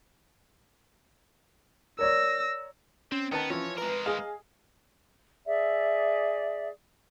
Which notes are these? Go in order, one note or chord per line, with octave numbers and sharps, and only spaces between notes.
A#4 C#5 D5 E6 A#6
C4 C#4
D#3 B3 B4 A5
E3 F3 C#5
G#3 A#4 B4 A#5
G#4 D#5 F5
G#4 D5 E5